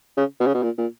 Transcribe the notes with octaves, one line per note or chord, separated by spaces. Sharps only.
C#3
B2
C#3
B2
A#2
A#2